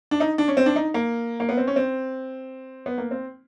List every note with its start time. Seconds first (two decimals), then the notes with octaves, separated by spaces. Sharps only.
0.11 D4
0.20 D#4
0.38 D4
0.48 C#4
0.57 C4
0.66 D4
0.76 D#4
0.94 A#3
1.40 A#3
1.49 B3
1.57 C4
1.67 C#4
1.76 C4
2.86 B3
2.98 A#3
3.11 C4